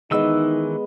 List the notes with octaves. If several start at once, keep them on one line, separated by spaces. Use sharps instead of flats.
D#3 E3 G#3 B3 D#4 D#5 E6